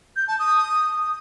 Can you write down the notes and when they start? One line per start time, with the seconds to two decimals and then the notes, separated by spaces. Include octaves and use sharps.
0.16 G6
0.28 A5
0.39 D#6